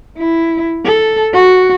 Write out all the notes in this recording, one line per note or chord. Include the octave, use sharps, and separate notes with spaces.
E4
A4
F#4